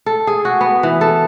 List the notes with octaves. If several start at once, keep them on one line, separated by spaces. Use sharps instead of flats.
A4
G#4
F#4
B3
E3
A4